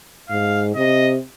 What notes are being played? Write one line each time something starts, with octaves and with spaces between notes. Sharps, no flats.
G#2 F5
C3 D#5